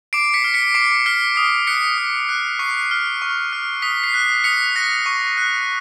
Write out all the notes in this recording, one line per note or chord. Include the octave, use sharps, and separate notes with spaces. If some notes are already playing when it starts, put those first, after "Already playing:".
D6 C7 D7
B6 C#7
F6
B6 C#7
D6 C7 D7
F6 B6 C#7
D#6 C7
F#6 B6 C#7
D#6
F#6
C#6 C7
F6
C#6
F6
D#6 B6
C7
F#6 B6
D#6 B6 C#7
F#6 A#6
C#6
F#6